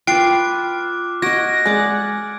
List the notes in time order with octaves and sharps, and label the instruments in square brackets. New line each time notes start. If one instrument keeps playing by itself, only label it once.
[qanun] F4 B4 [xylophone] G5 C7 [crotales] D6 F6 F#6
[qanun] F#4 D#5 [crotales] G#6 D7 [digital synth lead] A#6
[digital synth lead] G#3 [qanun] D5 F#5